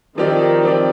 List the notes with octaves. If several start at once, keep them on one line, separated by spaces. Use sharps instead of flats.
D#3 F3 C4 G4 D5
F3 C4 G4 D5